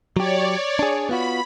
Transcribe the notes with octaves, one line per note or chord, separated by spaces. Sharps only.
F#3 G4 C#5 D5
D4 G#4
B3 F4 F#4 B5